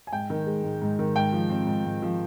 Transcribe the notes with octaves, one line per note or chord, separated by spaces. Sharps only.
G#5
G#2 G5
D#3
G#3
G#2
G#2
D#3
G#2 G5
F3
C4
G#2
G#2
F3